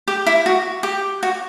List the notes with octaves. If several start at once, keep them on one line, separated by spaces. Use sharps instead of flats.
G4
E4
F#4
G4
F#4